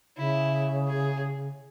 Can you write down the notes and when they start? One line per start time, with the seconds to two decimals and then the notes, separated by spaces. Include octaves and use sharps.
0.17 C#3 E4
0.88 G#4